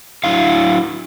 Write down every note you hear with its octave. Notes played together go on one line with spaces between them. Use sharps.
F#3 D4 E4 F5